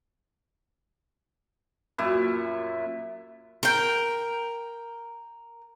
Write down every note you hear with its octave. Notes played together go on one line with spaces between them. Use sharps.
F#2 A#2 E4
A#4 G5